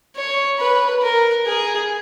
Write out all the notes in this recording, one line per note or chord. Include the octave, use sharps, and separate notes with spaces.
C#5
B4
A#4
G#4